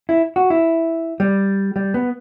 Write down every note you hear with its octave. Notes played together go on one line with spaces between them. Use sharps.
E4
F#4
E4
G3
G3
B3